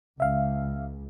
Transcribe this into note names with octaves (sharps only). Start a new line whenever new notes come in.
C#2 E5 F5